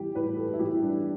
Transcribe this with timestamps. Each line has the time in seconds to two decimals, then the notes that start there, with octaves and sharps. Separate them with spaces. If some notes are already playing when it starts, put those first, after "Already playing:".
Already playing: E3 G3 G4
0.15 A2 B4
0.37 A4
0.53 E4
0.59 E3 G3 G4
0.83 D4